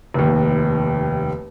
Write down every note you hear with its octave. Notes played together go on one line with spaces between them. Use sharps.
F1 D#2